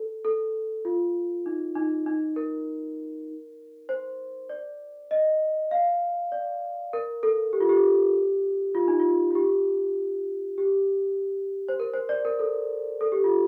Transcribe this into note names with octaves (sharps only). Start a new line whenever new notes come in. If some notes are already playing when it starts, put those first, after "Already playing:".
Already playing: A4
A4
F4
D#4
D#4
D#4
A#4
C5
D5
D#5
F5
D5
A#4
A4
G4
F4
G4
F4
D#4
F4
F4
G4
G4
C5
A#4
C5
D5
A#4
A4
A4
G4
F4